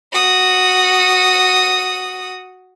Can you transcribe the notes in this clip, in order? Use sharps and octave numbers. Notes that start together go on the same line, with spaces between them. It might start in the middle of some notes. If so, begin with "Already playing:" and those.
F#4 D#6